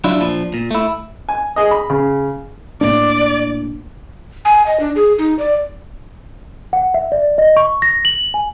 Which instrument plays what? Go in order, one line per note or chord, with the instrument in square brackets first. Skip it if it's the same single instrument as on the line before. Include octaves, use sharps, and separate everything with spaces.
[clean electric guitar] F#3 D4 E4 F4
A#2 F3 D4
A#2
A3 E4
[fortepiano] G#5
G#4 D#5
B5
C#3
[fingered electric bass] A2 A#3 D4 [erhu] D5
[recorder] G#5
D#5
D4
G#4
D#4
D5
[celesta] F#5
E5
D5
D#5
C#6
A#6
F#7
G#5